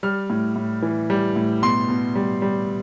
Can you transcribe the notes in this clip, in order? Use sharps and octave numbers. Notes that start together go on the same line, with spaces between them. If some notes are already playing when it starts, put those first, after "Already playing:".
G3 F6
A2
A2
E3
G3
A2
B2 C6
B2
G3
G3